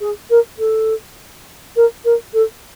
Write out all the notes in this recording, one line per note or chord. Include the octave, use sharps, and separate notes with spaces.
G#4
A#4
A4
A#4
A#4
A4